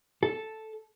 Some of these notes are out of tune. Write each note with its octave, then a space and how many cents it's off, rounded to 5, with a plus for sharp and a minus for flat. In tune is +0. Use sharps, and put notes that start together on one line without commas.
A4 -5